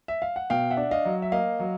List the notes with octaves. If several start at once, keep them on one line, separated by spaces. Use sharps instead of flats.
E5
F5
F#5
B2 F5 G5
E5 F#5
D4
D#5 F5
F#3
E5
A#3 D#5 F5
F#3